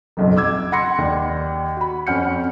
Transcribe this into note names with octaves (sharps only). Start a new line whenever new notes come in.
F#1 B1 F2
D6 E6 G#6
F#5 B5 C6 A#6 C#7
D#2 D5
F#4 B5
F2 C#4 F#5 F6 G6 C#7